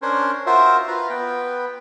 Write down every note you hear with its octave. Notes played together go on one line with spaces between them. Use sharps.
C#4 D4 A#4 C5 C#5
F4 F#4 A#4 C5 E5
F4 B4 A#5
B3 B4 G5